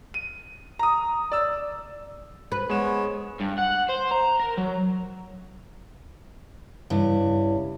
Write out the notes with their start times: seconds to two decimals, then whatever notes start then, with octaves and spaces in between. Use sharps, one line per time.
0.14 D#7
0.79 A#5 D#6
1.32 D5 E6
2.52 B4
2.70 G#3 B3 C#5 E7
3.40 G2
3.58 F#5
3.89 C5
4.11 A#5
4.40 A#4
4.58 F#3
6.90 G2 C#3 E4